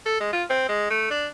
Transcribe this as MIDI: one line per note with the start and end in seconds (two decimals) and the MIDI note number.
0.06 0.19 69
0.20 0.30 56
0.33 0.43 65
0.50 0.64 60
0.69 0.87 56
0.90 1.09 57
1.10 1.27 62